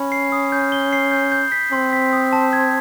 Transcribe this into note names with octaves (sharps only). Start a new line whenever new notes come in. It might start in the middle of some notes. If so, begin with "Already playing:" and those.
Already playing: C#4 B5
C7
D#6
G6
G7
C7
G6
G6
B6
C4 C6
B6
D#6
A5
G#6